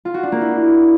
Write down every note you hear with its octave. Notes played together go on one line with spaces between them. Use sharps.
F4
F#4
D4
A#3
E4